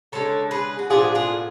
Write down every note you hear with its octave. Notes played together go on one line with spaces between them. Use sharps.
C#3 G#3 D4 A4 C#5
G#4 B4
F#4
A2 F3 B3 D4 F4 G#4
F4 G#4